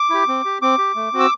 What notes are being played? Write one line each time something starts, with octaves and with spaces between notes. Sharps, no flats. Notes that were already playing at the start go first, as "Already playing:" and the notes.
Already playing: D6
E4 G4
C4
G4
C4 D6
G4
A3
C4 F#4
E6